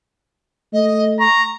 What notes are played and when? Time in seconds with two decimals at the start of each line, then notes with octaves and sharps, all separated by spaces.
0.73 A3 D#5
1.20 A#5 C#6